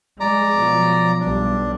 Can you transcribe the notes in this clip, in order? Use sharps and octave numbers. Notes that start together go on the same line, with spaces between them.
G#3 D5 A#5
B2 F3 F#3
B1 G3 D4